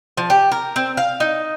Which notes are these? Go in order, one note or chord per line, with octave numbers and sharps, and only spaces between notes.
F3
G4
A#4
C4
F5
D#4